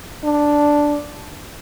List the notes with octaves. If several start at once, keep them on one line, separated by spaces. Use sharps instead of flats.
D4